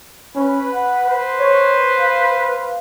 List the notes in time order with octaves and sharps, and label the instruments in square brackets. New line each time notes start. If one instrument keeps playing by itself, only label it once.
[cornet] C#4 [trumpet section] B4
[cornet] F#5
[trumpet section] B4 C5
[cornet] C#5
F5